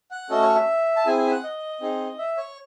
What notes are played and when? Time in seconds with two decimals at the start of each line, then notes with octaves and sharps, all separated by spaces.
0.11 F#5
0.30 A3 C#4 F#4 A4 D#5
0.42 C#5
0.55 E5
0.96 A5
1.06 C4 E4 G#4 G#5
1.18 G#5
1.27 E5
1.31 F#5
1.44 D#5
1.81 C4 D#4 G#4
2.18 E5
2.37 C#5